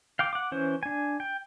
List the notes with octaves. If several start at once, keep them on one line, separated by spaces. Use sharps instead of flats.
F5 G5 D6
F#5 D6
E3 C#4 C5
D4 G#5
G5